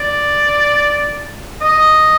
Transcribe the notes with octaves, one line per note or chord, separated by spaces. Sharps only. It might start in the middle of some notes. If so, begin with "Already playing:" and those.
Already playing: D5
D#5